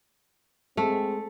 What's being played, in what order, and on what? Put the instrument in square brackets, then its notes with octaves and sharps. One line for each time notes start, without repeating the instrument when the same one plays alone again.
[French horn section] G#3 C4 G#4 [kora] A3